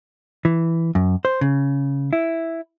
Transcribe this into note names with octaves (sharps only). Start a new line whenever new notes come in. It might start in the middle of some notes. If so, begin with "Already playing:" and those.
E3
F#2
C5
C#3
E4